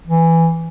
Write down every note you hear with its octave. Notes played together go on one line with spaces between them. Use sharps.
E3